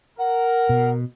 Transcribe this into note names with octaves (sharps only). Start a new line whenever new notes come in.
A#4 F#5
B2